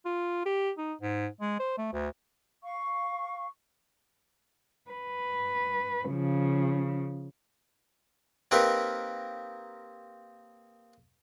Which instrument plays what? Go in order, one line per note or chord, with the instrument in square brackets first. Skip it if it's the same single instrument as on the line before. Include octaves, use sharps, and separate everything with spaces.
[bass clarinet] F4
G4
D#4
G#2
G#3
C5
A3
D2
[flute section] F5 C#6
[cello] B4
C#3 F3
[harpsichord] A#3 C4 D#4 G4 A#4 B4